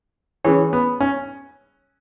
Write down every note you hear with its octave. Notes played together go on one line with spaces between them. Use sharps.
E3 C#4 G#4 C#5
B3
C#4